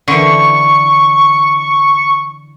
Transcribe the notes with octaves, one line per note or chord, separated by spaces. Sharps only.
D3 E3 C#6